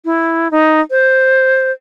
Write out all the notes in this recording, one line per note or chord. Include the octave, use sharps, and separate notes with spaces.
E4
D#4
C5